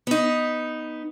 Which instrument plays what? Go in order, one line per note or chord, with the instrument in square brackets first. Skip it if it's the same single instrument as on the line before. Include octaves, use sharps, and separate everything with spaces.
[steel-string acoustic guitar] B3 D#4